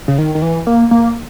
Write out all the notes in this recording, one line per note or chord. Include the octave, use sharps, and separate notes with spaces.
C#3
D#3
D#3
E3
A#3
A#3